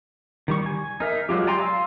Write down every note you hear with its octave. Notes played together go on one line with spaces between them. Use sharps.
D#3 G3 C#6
G#5
D#4 A#4 E5
F#3 G#3 F4 G4
D5 G5 G#5 A#5 C6
F5 C6 E6